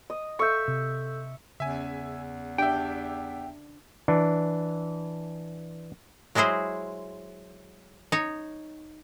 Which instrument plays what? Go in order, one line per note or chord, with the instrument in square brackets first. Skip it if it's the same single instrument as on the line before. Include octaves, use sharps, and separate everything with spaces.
[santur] D#5
[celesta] A4 E6 G6 [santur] E5 C#6
[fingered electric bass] C3
[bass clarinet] E2 [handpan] C#3 [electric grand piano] E5 G#5
[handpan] D4 [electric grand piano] G4 E5 [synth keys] G5
[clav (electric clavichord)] E3 D4
[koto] F#3 G#3 E4 G#4 C5
D#4 C#5